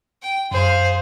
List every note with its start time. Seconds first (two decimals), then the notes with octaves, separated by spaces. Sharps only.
0.23 G5
0.51 F#2 G#4 C5 F5